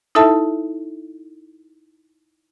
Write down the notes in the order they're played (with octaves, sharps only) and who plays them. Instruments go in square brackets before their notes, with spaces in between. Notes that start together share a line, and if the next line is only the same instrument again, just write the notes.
[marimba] D#4 E4 A4 E5 A5